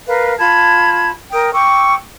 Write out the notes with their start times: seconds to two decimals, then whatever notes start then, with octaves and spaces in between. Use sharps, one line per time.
0.07 A#4 B4 F5
0.39 F4 A5 B5 G#6
1.32 A#4 G5 D#6
1.54 G5 C#6 D6 E6